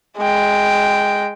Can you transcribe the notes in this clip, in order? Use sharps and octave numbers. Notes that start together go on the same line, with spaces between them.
G#3 G5